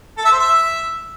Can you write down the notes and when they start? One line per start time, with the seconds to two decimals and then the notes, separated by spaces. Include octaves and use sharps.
0.17 A4
0.25 E5
0.32 C5
0.39 E5